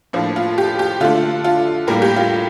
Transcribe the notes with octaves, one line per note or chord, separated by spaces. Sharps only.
A2 F3 A#3 D4
F4
G4
G4
D3 A3 D4 F4
F4
A2 G3 A#3 A#4
G4
F4